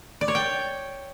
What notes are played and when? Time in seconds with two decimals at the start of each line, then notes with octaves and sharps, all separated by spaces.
0.21 D5
0.28 C#5
0.35 G5